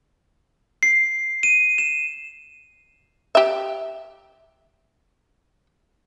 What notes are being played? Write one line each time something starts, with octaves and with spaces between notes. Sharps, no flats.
C7
D#7
E7
G4 E5